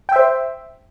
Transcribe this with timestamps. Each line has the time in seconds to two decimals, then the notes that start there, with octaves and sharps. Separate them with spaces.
0.09 G5
0.12 E5
0.16 C5